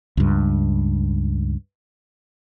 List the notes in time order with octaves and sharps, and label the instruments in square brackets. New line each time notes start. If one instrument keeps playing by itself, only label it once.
[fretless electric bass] C#2 G2